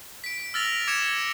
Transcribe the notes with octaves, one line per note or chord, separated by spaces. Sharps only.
B6 D7
E6 F6 A6 A#6 F7
D6 G#6 C#7 E7